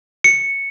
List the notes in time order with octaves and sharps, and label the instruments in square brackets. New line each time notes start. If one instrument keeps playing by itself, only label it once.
[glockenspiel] C#7